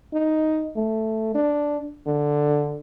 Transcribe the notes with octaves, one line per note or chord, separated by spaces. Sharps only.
D#4
A3
D4
D3